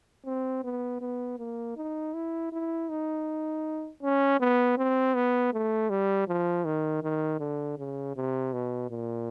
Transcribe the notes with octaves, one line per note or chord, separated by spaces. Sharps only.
C4
B3
B3
A#3
D#4
E4
E4
D#4
C#4
B3
C4
B3
A3
G3
F3
D#3
D#3
D3
C#3
C3
B2
A#2